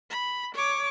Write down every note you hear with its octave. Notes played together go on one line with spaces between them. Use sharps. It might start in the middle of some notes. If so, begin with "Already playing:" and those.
B5
C#5 D6